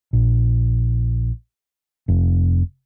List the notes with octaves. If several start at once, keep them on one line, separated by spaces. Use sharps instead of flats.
A#1
F1